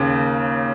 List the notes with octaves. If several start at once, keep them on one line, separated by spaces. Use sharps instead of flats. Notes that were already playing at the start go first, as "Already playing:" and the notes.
Already playing: D#2 C#3